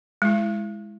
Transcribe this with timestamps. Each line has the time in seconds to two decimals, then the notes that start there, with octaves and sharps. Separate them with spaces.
0.22 G#3 E4